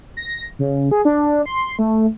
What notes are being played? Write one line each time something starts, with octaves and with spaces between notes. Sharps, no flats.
A#6
C#3
G#4
D4
C6
A3